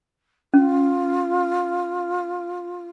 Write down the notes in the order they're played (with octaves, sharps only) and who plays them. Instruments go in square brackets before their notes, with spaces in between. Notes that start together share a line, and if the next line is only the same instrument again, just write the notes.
[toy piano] C#4 [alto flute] F4